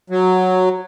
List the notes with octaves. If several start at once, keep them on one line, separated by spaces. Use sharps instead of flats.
F#3